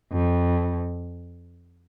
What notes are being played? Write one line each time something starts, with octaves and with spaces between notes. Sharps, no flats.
F2